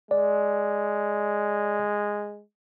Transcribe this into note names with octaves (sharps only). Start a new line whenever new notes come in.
G#3 D5